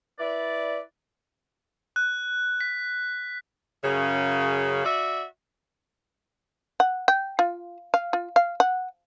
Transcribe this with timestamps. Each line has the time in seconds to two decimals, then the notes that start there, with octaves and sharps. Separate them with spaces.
0.19 E4 B4 D5
1.96 F#6
2.61 B6
3.84 F#2 C#3
4.85 F#4 D5 E5
6.80 F#5
7.08 G5
7.39 F4
7.94 F5
8.13 F4
8.36 F5
8.60 F#5